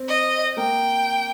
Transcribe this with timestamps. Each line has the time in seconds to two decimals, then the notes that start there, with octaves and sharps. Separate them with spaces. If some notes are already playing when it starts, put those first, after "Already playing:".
Already playing: C4
0.09 D#5
0.56 A#3 G5